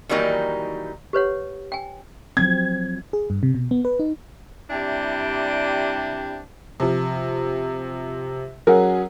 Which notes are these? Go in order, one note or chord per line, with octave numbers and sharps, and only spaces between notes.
D#3 E3 F#3 G3 A#3 D#4
G4 B4 C#5 F#5
G5 G#5
F3 F#3 C4 G#6
G#4
G2
C3
B2
B3
B4
D#4
C3 G3 D4 E4 G5
C3 F3
F#3 C#4 G#4 A#4 F#5